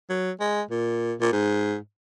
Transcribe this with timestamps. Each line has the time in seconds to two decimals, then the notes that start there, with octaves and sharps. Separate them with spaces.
0.09 F#3
0.40 G#3
0.71 A#2
1.21 A#2
1.33 G#2